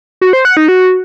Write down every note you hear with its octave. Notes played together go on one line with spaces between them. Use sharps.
F#4
C5
F#5
D#4
F#4